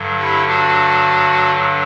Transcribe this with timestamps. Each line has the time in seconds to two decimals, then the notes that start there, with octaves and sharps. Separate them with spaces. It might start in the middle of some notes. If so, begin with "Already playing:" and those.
Already playing: G2 D3 F#3
0.18 E4 G4
0.47 D4 F#4